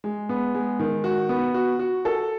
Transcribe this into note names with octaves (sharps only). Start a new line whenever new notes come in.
G#3
B3
G#3
D#3
F#4
B3
F#4
F#4
A4